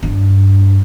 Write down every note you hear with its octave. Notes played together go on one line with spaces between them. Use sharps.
G2 D4